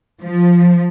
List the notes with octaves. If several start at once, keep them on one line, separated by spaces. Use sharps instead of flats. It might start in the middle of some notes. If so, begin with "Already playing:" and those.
F3